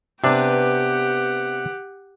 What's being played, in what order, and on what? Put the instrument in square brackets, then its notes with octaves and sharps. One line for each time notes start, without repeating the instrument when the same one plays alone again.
[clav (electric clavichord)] C3 D4 [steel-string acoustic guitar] B3 B4 [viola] G4 F#5